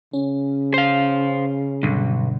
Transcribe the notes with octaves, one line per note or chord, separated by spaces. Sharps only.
C#3 C#4
C5 F5
B1 G2 B2 D3